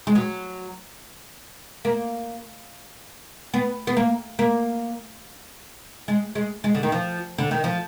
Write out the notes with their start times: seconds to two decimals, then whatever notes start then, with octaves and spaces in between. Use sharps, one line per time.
0.07 G#3
0.15 F#3
1.85 A#3
3.54 B3
3.87 B3
3.97 A#3
4.39 A#3
6.08 G#3
6.35 G#3
6.64 G#3
6.75 D3
6.83 D#3
6.92 F3
7.38 D3
7.51 D#3
7.64 F3